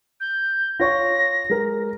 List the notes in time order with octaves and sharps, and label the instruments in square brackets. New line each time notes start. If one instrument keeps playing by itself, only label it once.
[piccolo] G6
[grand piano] F4 C#5 C#6 [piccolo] A#6
[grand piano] G#3 A#4